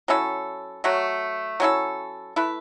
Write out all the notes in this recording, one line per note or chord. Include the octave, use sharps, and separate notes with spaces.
F#3 C#4 E4 A4
F#3 A3 F#4
F#3 C#4 E4 A4
A3 E4 B4